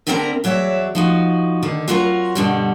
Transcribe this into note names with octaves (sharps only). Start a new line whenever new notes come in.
D2 D3 B3 C4 A#4 A#5
E2 F#3 C#5 D5 E5
F3 D#4 F#4
D3 D#3
F#3 C4 F4 F#4 A#4 A#5
G2 B2 D3 G3